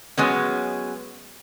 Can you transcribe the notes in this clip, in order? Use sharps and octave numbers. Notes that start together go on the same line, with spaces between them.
F#3 G#3 B3 C#4